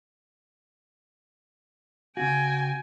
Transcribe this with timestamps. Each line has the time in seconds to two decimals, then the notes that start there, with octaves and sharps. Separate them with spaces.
2.17 C#3 F#4 G5 G#5